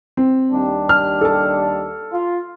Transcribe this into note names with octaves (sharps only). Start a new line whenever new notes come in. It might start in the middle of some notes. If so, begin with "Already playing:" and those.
C4
D#2 G3 D4
F6
A4 A5
F4